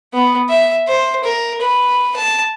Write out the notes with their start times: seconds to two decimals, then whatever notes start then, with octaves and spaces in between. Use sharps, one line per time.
0.13 B3
0.49 E5
0.88 C5
1.24 A#4
1.60 B4
2.15 A5